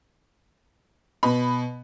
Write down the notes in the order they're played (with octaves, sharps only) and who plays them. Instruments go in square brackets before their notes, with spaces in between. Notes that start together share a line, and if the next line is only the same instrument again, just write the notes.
[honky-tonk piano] B2 B5